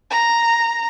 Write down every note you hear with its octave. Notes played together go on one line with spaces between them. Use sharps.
A#5